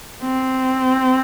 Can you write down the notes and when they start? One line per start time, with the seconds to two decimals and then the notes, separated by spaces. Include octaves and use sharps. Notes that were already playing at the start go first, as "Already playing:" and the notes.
0.22 C4